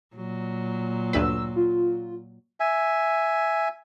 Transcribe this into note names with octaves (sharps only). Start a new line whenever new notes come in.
A#2 F#3
D2 G2 B4 E6
F4
E5 G#5